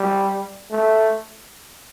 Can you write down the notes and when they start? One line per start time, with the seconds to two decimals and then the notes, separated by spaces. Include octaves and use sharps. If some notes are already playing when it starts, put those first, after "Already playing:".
Already playing: G3
0.71 A3